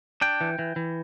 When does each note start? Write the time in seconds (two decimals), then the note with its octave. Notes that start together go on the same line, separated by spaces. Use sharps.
0.21 D4 G5
0.41 E3
0.59 E3
0.76 E3